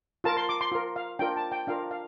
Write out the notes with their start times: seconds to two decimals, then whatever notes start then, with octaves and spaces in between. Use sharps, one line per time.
0.24 F4 A#4 A5
0.37 C6
0.49 D6
0.61 C6
0.72 F4 A#4
0.96 F5
1.19 D4 F4 A#4 G5
1.36 A5
1.52 G5
1.67 D4 F4 A#4 F5
1.91 F5